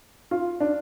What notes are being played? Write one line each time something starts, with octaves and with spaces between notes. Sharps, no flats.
F4
D4